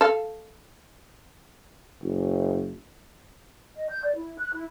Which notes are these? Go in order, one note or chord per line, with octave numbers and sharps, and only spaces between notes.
A4 F5
F#1
D#5
G6
D5
E4
F#6
E4